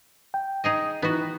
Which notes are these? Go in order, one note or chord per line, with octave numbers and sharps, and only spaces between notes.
G5
D#4 G#4 D#5
E3 B3 D#4 F#4 B4